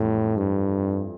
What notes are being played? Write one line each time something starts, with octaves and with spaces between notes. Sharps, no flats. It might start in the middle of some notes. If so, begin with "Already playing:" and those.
Already playing: F2 A2 E3 G3
G2